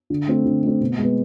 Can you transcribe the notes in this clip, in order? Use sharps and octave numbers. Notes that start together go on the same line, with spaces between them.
D3
A3 C4
D3
A3 C4
B2
G#3 B3